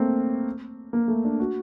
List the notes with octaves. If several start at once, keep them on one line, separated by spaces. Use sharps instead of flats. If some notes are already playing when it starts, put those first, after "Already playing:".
Already playing: A3 A#3 C4
A#3
A3
D4
F#4